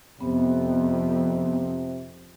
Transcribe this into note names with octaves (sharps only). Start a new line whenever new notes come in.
F2 C3 B3